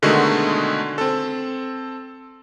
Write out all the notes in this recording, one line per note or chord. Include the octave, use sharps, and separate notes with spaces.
B2 D3 D#3 G#3 A3 F#4
C4 A4